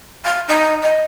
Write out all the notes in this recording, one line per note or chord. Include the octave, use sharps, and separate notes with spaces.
F5
D#4
D#5